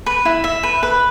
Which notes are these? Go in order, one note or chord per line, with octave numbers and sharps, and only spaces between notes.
B4
E4
E5
B4
B4